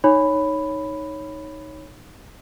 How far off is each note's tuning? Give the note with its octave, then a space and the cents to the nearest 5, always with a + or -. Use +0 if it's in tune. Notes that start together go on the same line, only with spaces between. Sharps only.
D#4 +0 C#5 +0 B5 +5